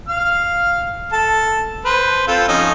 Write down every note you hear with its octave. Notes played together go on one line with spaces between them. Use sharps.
F5 F6
A4 A5
B4 C5
C4 F4 A4
F3 C#4 D#4